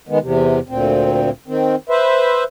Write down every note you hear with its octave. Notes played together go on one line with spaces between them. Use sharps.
D#3 G#3 B3
E2 C3
D2 A#2 C4
D#3 C4
B4 C5 E5